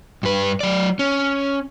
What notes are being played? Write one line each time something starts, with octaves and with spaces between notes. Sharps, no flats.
G2 B4
F#3 D5
C#4